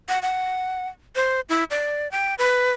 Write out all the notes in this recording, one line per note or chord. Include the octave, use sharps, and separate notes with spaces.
F#5
F#5
C5
E4
D5
G5
B4